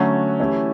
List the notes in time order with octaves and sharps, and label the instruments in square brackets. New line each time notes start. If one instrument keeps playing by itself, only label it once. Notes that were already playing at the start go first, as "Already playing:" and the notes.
Already playing: [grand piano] D3 F#3 A3 C#4
E3 A3 C#4 E4 G4